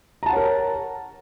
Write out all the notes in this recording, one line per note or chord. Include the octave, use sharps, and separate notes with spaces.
A#4 C#5 F#5 A5 A#5